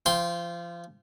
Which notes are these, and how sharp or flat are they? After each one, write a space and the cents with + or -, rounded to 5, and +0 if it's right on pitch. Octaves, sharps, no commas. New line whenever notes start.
F3 -25 G5 +0 C6 +0